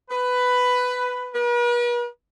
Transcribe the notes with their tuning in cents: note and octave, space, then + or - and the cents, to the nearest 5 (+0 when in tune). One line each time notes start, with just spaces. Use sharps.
B4 +10
B4 -45